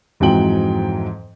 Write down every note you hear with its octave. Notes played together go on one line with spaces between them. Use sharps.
F2 G#2 E3 F#3 G5 F#7